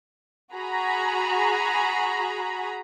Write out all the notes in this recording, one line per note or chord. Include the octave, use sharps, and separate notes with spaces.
F#4 G#4 A#5 B5